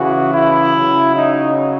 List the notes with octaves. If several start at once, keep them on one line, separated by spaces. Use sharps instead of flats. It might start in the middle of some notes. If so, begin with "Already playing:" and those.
Already playing: C#3 E3 F#4
E4
C#3 F#3
D#4